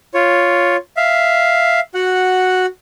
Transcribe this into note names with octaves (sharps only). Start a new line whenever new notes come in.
F4 C#5
E5 F5
F#4 F#5